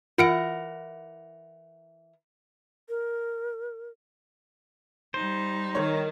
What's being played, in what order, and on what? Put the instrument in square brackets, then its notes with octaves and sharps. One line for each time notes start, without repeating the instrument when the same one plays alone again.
[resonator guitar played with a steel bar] E3 A#4 F#5 [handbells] F4 C#7 D7
[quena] A#4
[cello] G3 D#4 [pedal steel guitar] C5
[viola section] D#3 [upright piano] C#5